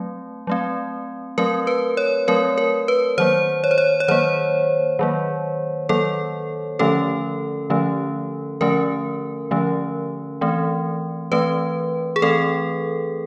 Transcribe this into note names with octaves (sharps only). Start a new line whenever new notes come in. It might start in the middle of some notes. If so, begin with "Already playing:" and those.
Already playing: F#3 A3 C4
F#3 A3 C4
F#3 A3 C4 A#4
B4
C#5
F#3 A3 C4 A#4
A#4
B4
D#3 F#3 A#3 C5
C#5
C5
C#5
C#5
D#3 F#3 A#3 C5
D#3 F#3 A#3
D#3 F#3 A#3 A4
D3 F3 A3 C#4 A4
D3 F3 A3 C#4
D3 F3 A3 C#4 A#4
D3 F3 A3 C#4
E3 A3 C4
E3 A3 C4 B4
G#4
E3 A3 C4 A4